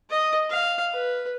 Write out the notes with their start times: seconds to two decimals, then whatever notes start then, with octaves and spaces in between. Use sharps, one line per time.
0.10 D#5
0.50 F5
0.93 B4